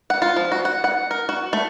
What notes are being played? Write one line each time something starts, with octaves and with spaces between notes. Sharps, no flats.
F#5
F4
F3
F#4
F#5
F#5
A#4
F#4
A3